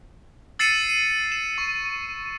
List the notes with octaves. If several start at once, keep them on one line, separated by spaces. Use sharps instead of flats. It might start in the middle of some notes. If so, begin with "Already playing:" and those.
E6 A6 C7 C#7 D#7 E7
D#7
E7
C#6